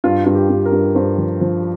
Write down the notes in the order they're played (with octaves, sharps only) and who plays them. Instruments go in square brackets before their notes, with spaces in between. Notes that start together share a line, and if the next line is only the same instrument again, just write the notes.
[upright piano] G2 F4
G2 F4
G4
G2
A#4
G2
G2 C5
F3
F3